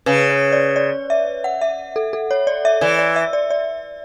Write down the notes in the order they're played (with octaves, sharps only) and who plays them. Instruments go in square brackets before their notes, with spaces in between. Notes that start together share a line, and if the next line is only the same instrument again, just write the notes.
[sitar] C#3 [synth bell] B4
[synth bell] C#5
D5
D5
E5
F#5
E5
A4
A4
C#5
D5
E5
[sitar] E3 [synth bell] D5
[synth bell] D5
E5
D5
D5